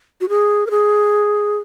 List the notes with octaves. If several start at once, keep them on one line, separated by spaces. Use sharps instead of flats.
F#4
G#4
A#4
G#4